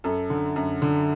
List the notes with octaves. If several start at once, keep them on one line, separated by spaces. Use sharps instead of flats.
F#2 A4
D3
F#2
D3